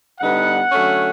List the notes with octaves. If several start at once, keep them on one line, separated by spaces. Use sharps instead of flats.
D3 G3 B3 D#4 F#5
D3 F#3 A3 C#4